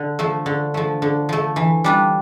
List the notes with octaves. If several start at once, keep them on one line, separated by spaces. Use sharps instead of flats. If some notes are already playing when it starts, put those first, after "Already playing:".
Already playing: D3
F3 A3
D3
F3 A3
D3
F3 A3
E3
G3 D4 F4